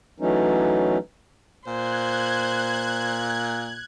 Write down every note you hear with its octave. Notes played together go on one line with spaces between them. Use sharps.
E3 F#3 A3 C#4 D#4
A#2 C5 F#6 G#6